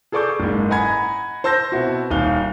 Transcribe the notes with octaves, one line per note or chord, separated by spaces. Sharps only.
G#4 A4 D5 C#6 D6 G6
F#1 G#2
D#5 F#5 G#5 A#5 B5 G#6
C5 A5 E6 G6 A#6
B2 C4 E4 F#4
D#1 D#4 F5 G7